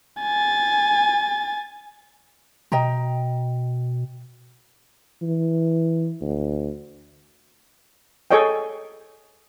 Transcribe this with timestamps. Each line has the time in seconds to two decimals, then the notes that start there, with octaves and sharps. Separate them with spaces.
0.21 G#5 A6
2.72 B2 D#5 G5 A#5
5.22 E3
6.21 D2
8.31 G#4 A4 C#5 D#5 G5